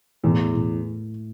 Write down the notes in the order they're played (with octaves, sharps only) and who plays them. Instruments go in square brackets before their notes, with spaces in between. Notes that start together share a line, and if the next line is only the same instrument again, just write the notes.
[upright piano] E2 [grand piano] A2
[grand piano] A2